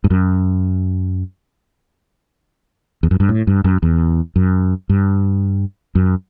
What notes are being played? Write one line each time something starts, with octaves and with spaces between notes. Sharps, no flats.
G2
F#2
E2
F#2
G2
A2
G2
F#2
E2
F#2
G2
F#2